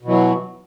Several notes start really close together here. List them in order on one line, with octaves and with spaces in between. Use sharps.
B2 E3 F#3